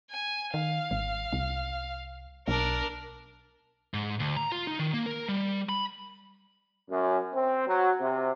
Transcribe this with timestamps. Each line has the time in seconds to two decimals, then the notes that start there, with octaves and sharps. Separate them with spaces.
0.10 G#5
0.54 D#3 F5
0.91 G#1
1.32 C2
2.48 B1 D4 A#4
3.94 G#2
4.20 D2
4.37 A#5
4.52 F4
4.67 D#4
4.79 D#3
4.93 A#3
5.06 A#4
5.29 G3
5.69 B5
6.90 F#2
7.34 C4
7.67 F#3
8.01 C3